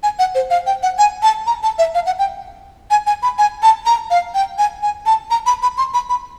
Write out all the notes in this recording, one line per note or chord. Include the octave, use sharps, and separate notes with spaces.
G#5
F#5
C5
F5
G5
F#5
G#5
A5
A#5
A5
E5
F5
F#5
G5
G#5
G#5
B5
G#5
A5
A#5
F5
G5
G#5
G#5
A5
A#5
B5
B5
C6
B5
B5